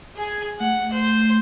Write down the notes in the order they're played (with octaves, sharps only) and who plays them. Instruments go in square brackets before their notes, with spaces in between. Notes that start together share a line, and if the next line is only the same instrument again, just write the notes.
[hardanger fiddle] G#4 G#5
[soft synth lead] A3 [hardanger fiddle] F#5
[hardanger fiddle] C5